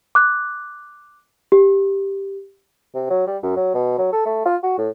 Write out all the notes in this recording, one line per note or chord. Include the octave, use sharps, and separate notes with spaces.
D6 F#6
G4
C3
F#3
G3
F#2
F#3
B2
F#3
A4
A3
F4
F#4
A2